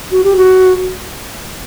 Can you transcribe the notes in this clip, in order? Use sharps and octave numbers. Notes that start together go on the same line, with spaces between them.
F#4
G4
F#4